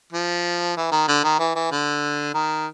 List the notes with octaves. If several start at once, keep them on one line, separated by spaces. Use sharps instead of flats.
F3
E3
D#3
D3
D#3
E3
E3
D3
D#3